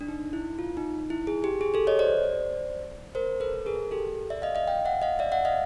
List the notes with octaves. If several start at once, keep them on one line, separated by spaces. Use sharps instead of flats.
D4
D#4
E4
F4
D#4
E4
G#4
G4
G#4
G4 A4
C#5 D#5
C5 D5
A#4 C5
A4 B4
G#4 A#4
G4 A4
D5 E5
D#5 F5
D#5 F5
F5 G5
E5 F#5
D#5 F5
D5 E5
E5 F#5
D#5 F5